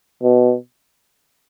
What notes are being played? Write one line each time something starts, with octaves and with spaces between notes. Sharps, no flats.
B2